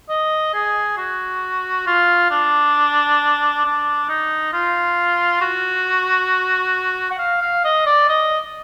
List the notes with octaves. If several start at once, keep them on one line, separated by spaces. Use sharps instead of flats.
D#5
G#4
F#4
F4
D4
D4
D#4
F4
F#4
F#5
F5
F5
D#5
D5
D#5